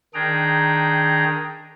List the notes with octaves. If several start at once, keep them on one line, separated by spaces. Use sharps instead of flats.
D#3 D4 G#4 G5 A#5